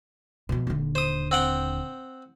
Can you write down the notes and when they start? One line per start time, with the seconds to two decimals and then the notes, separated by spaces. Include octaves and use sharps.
0.49 B2 F3
0.67 D#1 D3
0.95 C5 D#6
1.31 C4 F#5 G5